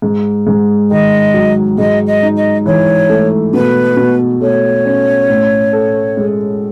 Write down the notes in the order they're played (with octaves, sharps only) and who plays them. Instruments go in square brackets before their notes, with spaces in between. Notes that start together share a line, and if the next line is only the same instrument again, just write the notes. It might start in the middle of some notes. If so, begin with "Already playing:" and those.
[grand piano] G#2
G#2
[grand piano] D#3 [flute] D#5
[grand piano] F#3
[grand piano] G#2 [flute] D#5
[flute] D#5
[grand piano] D#4
[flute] D#5
[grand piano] E3 [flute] C#5
[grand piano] A3
[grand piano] B2 [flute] B4
[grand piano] B2
[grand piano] A3 [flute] C#5
[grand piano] C#4
A2
A4
G#3